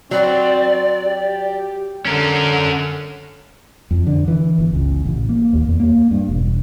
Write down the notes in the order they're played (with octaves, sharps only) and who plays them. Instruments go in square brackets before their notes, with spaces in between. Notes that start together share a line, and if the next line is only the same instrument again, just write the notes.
[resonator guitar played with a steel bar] F#3 [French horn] C4 [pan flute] D5
[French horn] G4
[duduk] D3 [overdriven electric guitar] C#4 A#4
[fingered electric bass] F2
D3
E3
G1
C#2
A1
A#3
D#2
E2
A#3
G2
E1